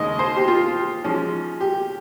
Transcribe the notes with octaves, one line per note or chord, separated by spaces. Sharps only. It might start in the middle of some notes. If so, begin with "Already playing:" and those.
Already playing: D#2 C#3 G#3 D#5
C5
G4
F4
G#2 F3 G#3 C#4
G4